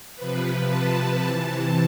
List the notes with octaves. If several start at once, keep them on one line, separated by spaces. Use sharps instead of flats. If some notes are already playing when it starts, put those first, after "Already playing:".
C3 F3 B4
A5
C3 E3